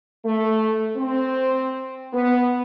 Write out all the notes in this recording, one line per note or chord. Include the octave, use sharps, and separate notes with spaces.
A3
C4
B3